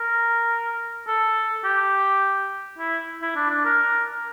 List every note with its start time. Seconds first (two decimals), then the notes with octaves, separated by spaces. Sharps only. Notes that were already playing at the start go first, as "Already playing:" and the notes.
Already playing: A#4
1.07 A4
1.64 G4
2.78 E4
3.22 E4
3.35 D4
3.50 D4
3.65 A#4